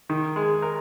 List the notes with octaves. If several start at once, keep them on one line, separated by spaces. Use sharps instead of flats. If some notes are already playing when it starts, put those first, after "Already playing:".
D#3
G#3
A#4